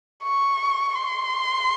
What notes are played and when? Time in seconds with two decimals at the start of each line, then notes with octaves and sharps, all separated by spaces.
0.23 C#6
0.96 C6